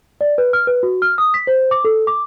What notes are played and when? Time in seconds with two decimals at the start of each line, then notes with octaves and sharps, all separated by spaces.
0.21 D5
0.38 B4
0.53 F6
0.67 B4
0.83 F#4
1.02 F6
1.18 D#6
1.34 B6
1.47 C5
1.71 D6
1.85 A4
2.07 D6